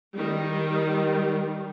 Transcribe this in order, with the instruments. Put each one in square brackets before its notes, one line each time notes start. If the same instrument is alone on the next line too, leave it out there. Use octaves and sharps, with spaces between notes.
[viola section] D#3 G3